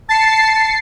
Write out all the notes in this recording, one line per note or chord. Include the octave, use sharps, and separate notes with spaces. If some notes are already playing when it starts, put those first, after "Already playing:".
A5 A6 C7 C#7